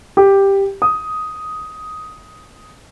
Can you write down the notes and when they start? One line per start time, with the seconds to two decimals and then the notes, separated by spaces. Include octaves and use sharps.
0.17 G4
0.82 D#6